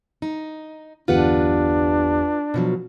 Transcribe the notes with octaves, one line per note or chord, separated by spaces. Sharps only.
D#4
G1 E2 D4 F4 G4 B4 F#5
B2 F3 F#3